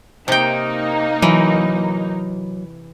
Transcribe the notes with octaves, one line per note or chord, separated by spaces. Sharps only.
C3 A#3 D#4 G5
E3 F#3